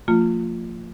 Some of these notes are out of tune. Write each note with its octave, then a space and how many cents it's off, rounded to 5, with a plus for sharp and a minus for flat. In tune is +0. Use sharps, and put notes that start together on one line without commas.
F3 +0 A#3 -45 F4 +0